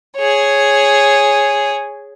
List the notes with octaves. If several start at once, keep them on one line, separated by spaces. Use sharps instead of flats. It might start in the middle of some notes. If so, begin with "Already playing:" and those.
G#4 C#5